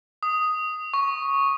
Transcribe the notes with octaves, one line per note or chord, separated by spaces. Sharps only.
D#6
C#6